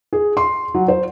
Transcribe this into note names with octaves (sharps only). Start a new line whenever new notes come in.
G#4
C6
F#3
C5